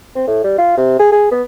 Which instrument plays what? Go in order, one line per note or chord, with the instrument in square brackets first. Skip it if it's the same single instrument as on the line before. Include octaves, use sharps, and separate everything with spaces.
[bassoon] C4
A2
G3
F4
C3
G#4
G#4
B3